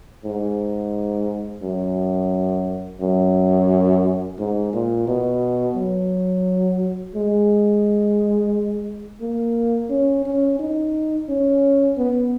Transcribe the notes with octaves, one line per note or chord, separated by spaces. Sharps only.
G#2
F#2
F#2
G#2
A#2
B2
F#3
G#3
A#3
C#4
C#4
D#4
C#4
B3